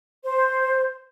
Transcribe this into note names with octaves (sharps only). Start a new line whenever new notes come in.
C5